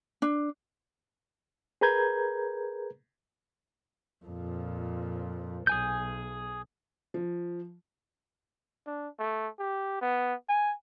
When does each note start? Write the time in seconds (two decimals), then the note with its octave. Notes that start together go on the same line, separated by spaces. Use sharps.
0.22 D4
1.81 G#4 A#4 B4 A#5 G6 G#6
4.25 F2 A#2
5.67 B1 G#4 G#5 G6
7.14 F3
8.87 D4
9.19 A3
9.59 G4
10.01 B3
10.49 G#5